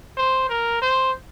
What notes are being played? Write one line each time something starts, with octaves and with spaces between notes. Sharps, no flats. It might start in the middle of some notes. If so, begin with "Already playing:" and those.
C5
A#4
C5